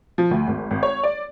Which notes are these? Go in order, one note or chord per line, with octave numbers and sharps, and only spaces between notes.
F3
D2
G#1
G#1
C#5
D5